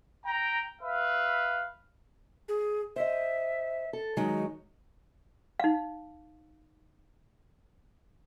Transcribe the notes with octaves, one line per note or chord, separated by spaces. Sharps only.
G5 A#5
B4 E5 F5
G#4
C5 D#5 E5
A4
D#3 F#3 G#3 D#4
D#4 F5